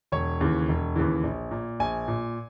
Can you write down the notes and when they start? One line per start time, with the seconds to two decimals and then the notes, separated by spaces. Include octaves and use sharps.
0.12 E1 C#5
0.41 D#2 C#3 E3
0.68 E1
0.96 D#2 C#3 E3
1.23 A#1
1.51 A#2
1.80 A#1 G#5
2.08 A#2